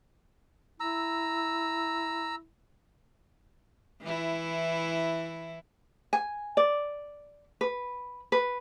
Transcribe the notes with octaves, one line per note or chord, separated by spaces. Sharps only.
E4 A#5 E6
E3 E4
G#5
D5
B4
B4